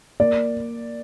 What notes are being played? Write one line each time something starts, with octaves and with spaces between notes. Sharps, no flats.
A#3 D5